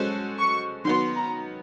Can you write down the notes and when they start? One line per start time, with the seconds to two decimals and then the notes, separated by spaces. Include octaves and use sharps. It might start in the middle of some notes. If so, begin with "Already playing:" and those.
Already playing: G#3 C#4 F#4 A4 C5
0.38 C#6
0.85 D#3 F#3 B3 C6
1.16 A#5